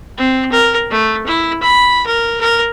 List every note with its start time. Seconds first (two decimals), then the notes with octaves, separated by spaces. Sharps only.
0.18 C4
0.52 A#4
0.90 A3
1.26 E4
1.63 B5
2.06 A#4
2.41 A#4